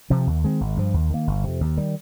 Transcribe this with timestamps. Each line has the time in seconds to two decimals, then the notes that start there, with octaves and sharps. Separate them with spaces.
0.10 C3 F3 C4
0.27 D#2
0.44 D#3 G#3 C4
0.61 G#1
0.77 G2 F3
0.94 D#2
1.10 D#3 A#3
1.27 G1
1.44 F2 C3
1.61 D#2
1.77 D#3 G3